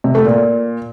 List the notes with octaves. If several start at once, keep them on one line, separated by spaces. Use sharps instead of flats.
C3
A3
A#2